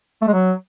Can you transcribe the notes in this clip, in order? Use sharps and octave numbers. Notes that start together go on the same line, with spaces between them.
A3
G#3
F#3